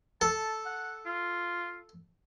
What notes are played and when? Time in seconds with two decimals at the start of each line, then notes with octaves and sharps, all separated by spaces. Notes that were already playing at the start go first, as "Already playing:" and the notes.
0.21 A4 A5
0.66 F#5
1.06 F4